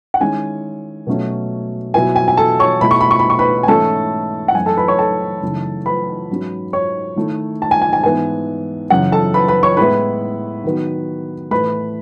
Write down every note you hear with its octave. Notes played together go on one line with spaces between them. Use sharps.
F#5
D#3 G#3 C#4 E4 G#5
B2 F#3 A3 C#4
B2 F#3 B3 E4 G#5
G#5
G#5
A4 A5
C#5 C#6
B2 A3 E4 B5
C#6
B5
C#6
B5
C#6
B4 B5
G#5
G#2 E3 A3 C#4 E4 A4 A5
F#5
F#2 E3 A3 G#5
A4 A5
B4 B5
C#5 C#6
A4 A5
F#2 C#3 E3 A3 D#4
B4 B5
G#2 F#3 C#4
C#5 C#6
D#3 A3 E4
A5
G#5
G#5
G#5
G#2 E3 B3 E4 G#5
F#2 C#3 E3 F#5
A4 A5
B4 B5
B4 B5
C#5 C#6
A2 G#3 B3 E4 B4 B5
D#3 F#3 B3
A2 E3 A3 B4 B5